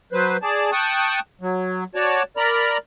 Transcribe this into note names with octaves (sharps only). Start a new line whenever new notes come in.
F#3 B4 C5
G#4 D5 A5
G5 A5 C#6 D#6 F#6
F#3
F#4 C#5 D5 A5
A#4 D5 A#5 B5